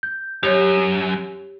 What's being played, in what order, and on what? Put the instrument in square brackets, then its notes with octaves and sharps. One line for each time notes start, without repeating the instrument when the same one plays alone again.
[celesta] G6
[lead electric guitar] F#2 [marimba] G4 C#5 [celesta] F7